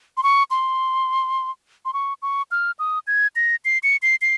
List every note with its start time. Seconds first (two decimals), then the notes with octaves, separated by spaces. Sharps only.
0.17 C6
0.23 C#6
0.51 C6
1.85 C6
1.94 C#6
2.22 C#6
2.51 F6
2.79 D#6
3.07 G#6
3.36 A#6
3.65 C7
3.83 C#7
4.02 C7
4.22 C7